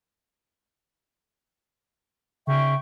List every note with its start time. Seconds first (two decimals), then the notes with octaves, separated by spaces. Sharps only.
2.47 C#3 E5 G5 C#6